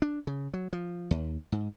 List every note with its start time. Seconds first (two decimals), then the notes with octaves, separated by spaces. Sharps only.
0.02 D4
0.27 C#3
0.54 F#3
0.73 F3
1.11 D#2
1.52 G#2